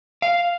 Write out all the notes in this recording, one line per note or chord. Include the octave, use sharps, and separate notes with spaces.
F5